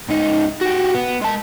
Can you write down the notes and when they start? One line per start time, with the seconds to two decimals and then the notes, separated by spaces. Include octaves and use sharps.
0.09 C#2 D#4
0.61 F#4 G4
0.94 B3
1.21 G#3 A5